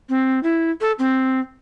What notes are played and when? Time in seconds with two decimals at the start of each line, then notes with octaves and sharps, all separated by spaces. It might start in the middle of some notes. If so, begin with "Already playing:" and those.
0.09 C4
0.43 E4
0.81 A4
0.99 C4